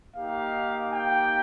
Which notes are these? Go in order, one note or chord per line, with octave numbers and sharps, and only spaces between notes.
A#3 D#4 G4 F5
G5